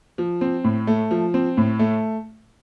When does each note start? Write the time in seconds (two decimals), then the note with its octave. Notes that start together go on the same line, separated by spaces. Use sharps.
0.18 F3
0.41 C4
0.64 A2
0.87 A3
1.11 F3
1.34 C4
1.57 A2
1.79 A3